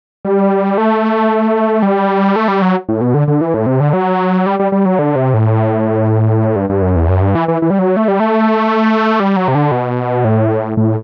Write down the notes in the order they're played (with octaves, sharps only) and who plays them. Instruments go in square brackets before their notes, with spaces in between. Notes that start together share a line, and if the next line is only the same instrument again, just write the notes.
[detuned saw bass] G3
A3
G3
A3
G3
F#3
A2
B2
D3
D3
E3
A2
C3
D3
F#3
G3
G3
G3
F#3
D3
C3
A2
G2
G2
F#2
E2
F#2
G2
E3
E3
E3
G3
F#3
A3
G3
A3
G3
F#3
C3
D3
B2
A2
A2